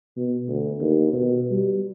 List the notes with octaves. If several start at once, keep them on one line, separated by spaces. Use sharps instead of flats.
B2
D2
D#2
B2
G3